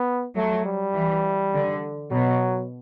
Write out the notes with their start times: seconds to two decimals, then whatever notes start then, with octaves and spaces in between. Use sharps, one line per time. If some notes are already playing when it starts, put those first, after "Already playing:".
Already playing: B3
0.36 F#3 A3
0.65 G3
0.94 E3
1.53 D3
2.11 B2 F#3